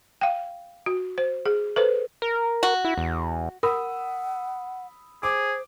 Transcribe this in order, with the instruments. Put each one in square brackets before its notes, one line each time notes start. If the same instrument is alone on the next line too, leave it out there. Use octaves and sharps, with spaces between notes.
[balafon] F5 G5
F#4
C5
G#4
A4 B4 C5
[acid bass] A#4
[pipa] F#4
[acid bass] E4
E2
[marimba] A#4 [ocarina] F#5 [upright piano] B5 D#6 E6
[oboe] G#4 [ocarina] C5 [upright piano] D6